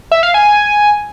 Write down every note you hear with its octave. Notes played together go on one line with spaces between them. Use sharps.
E5
F5
G#5